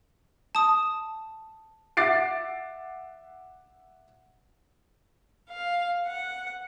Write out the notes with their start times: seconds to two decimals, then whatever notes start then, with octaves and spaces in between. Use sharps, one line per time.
0.55 A5 D#6
1.97 E5 F#5 D6 A6 C7 D7
5.50 F5
6.07 F#5